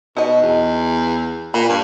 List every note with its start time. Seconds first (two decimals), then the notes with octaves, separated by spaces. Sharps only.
0.17 B2 D#4 D#5
0.42 E2
1.54 A#2 B5
1.70 G2